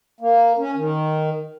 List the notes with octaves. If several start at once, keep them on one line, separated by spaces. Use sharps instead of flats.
A#3
C#4
D#3